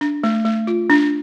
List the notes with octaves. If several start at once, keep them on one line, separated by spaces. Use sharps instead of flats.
D4
A3
A3
F4
D4